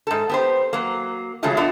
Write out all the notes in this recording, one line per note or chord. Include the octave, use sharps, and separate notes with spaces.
G#2 A4
B3 G4 C5
F#3 A#3
C#3 E3 F#3 G#3 A3 F4
B3 D4 F4 A4 D#5